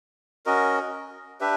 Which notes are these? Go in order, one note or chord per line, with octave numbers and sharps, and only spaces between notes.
C#4 F#4 A#4 D#5
D4 G4 B4 E5